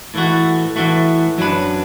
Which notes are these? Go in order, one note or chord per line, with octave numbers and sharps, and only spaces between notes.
A2 E3 A3 F#4
A2 E3 A3 F#4
F#2 F#3 D4 B4